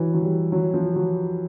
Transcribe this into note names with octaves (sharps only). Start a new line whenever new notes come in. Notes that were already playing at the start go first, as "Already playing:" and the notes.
Already playing: E3 F#3
F#3
G3
F#3
F3
F#3